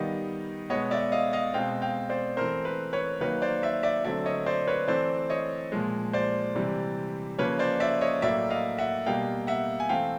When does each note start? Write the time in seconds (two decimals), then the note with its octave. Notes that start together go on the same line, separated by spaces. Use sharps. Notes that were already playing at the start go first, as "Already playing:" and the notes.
Already playing: D#3 G3 B3 D#5 F5
0.70 B2 G#3 B3 C#5 D#5
0.91 D5 E5
1.12 D#5 F5
1.33 D#5 F5
1.54 B2 G#3 C4 F5 G5
1.82 F5 G5
2.09 C5 D5
2.37 E3 A3 C4 A#4 C5
2.65 B4
2.93 B4 C#5
3.21 D#3 F#3 A#3 B4 C#5
3.42 C5 D5
3.63 D5 E5
3.83 D5 E5
4.04 D3 F#3 A3 C4 D5 E5
4.25 C#5 D#5
4.46 C5 D5
4.67 B4 C#5
4.87 E3 A3 C4 C5 D5
5.30 C#5 D#5
5.72 A#2 F3 G#3
6.13 C5 D5
6.55 C3 E3 G3
7.38 C#3 F3 A#3 B4 C#5
7.59 C5 D5
7.80 D5 E5
8.01 C#5 D#5
8.22 A2 F#3 A#3 D5 E5
8.50 D#5 F5
8.78 E5 F#5
9.06 B2 G3 A#3 F5 G5
9.47 E5 F#5
9.80 G#5
9.89 E3 A3 C4 F5 G5